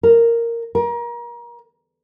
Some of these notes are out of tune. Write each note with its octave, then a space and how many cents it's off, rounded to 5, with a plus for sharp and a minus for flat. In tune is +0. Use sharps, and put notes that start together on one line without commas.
A#4 -5
A#4 +30